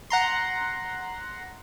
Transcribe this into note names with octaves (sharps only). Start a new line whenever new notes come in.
F#5 A#5 C6